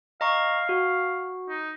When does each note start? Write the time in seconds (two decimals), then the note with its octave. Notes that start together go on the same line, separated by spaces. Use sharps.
0.21 D#5 F5 A#5 C#6
0.69 F#4
1.49 D#4